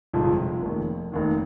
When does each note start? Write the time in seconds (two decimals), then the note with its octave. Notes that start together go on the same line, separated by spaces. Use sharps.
0.13 G1 F2 C3 F3 G#3
0.62 F1 D#2 D#3
1.12 F1 D#2 D#3